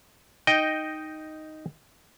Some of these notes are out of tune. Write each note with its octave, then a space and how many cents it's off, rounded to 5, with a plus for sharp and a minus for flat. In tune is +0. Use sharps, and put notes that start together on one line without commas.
D#4 +0 D#5 +0 G5 +0